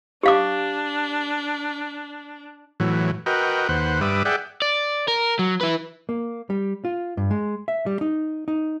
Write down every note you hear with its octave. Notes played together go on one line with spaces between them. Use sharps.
D4 G4 F5 D6
A2 E3 F#3
F#4 A#4 B4 D#5 G5
D#2 B4 C5 F#5
G2 G3 B4 E5 D6 D#6
G#4 D5 E5 F#5 G5
D5
A#4
F#3
E4 B4
A#3
G3
F4
G2
G#3
E5
G3
D#4
D#4